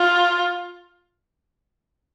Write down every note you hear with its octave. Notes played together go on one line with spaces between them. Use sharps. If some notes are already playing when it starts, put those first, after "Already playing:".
Already playing: F4